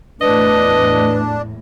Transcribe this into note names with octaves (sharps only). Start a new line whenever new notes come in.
E2 A2 D4 B4 D#5